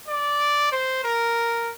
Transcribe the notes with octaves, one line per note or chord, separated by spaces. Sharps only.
D5
C5
A#4